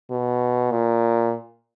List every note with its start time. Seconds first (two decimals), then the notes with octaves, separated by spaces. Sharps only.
0.11 B2
0.72 A#2